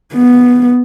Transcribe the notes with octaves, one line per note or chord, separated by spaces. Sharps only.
B3